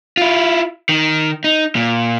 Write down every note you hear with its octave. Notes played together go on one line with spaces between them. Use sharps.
E4 F4
D#3
D#4
A#2